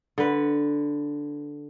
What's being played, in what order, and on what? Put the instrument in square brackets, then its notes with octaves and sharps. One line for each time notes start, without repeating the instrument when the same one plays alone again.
[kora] D3 B4